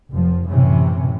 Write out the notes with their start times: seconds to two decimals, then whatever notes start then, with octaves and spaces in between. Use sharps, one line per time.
0.12 F1 F3
0.50 F#2 A2 C3 E3 C#4